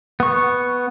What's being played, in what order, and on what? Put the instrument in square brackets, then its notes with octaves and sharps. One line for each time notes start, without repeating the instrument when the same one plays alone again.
[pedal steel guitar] B3 C#6